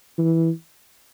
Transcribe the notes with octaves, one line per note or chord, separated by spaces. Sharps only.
E3